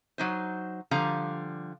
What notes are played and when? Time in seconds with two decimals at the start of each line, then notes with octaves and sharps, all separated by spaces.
0.18 F#3 D#4 C5
0.91 D3 F3 G3 F5 A#5